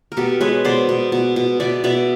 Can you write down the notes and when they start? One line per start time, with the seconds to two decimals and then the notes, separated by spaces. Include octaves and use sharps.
0.12 A#4
0.17 B2 G4 A4
0.41 G#3 B4 C#5
0.65 B2 C5 D5
0.89 B2
1.12 B2
1.36 B2
1.60 B2 D5 E5
1.84 B2 D5 E5